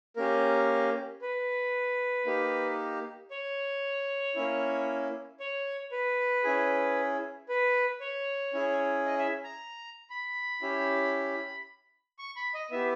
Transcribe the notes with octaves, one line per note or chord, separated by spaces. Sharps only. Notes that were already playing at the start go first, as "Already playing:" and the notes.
A#3 C#4 G4 A#4
B4
A#3 D#4 G4
C#5
A#3 C#4 E4
C#5
B4
C#4 E4 G#4
B4
C#5
C#4 E4 G#4
D#5
E5
A#5
B5
C#4 E4 G4
C#6
B5
D#5
B3 E4 G4 E5